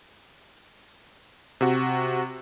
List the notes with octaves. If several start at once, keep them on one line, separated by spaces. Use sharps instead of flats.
C3 F#4